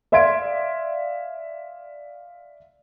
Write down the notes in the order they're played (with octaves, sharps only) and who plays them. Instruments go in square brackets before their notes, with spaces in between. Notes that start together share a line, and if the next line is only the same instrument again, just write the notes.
[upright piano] D5 E5 F5 C6 G#6 D7